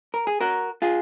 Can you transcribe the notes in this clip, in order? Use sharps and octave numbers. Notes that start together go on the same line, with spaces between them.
A#4
G#4
F#4 A#4
F4 G#4